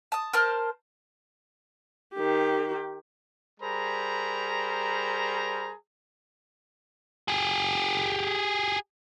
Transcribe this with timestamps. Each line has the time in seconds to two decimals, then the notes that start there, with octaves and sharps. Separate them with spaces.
0.12 A5 D#6
0.33 A#4 C5 A5 F6
2.15 D#3 G4
3.60 G3 G#4 A#4 C5 A#5 B5
7.28 G4 G#4